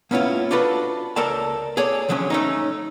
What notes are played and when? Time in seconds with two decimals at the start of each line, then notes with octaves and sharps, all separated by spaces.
0.11 A#3 B3 C#4 E4 F4
0.51 D4 F4 F#4 A4 B4
1.16 C#2 A4 A#4 D5 A5
1.77 G#4 A4 C#5 D5
2.09 C2 D3 F3 F#3 C#4
2.30 A3 C#4 D#4